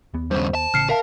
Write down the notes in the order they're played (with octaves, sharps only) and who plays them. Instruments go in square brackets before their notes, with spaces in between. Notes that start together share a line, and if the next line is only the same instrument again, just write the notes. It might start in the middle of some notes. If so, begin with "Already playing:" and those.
[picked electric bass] D#2 B3
[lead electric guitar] G2 C#3 [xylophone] C5
[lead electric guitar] A5
[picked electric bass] A1 C#3 [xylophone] F6 C7 C#7
[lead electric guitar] A#4 [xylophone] E5 F5 A5